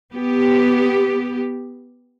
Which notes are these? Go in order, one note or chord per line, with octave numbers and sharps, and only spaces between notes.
B3 G4